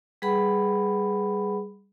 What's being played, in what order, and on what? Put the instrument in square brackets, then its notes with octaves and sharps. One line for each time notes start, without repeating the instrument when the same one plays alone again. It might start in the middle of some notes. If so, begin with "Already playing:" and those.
[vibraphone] G3 G#4 B4 F#5 B5